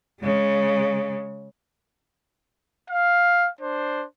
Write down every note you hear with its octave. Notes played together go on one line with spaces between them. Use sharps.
C#3 G#3
F5
D4 C5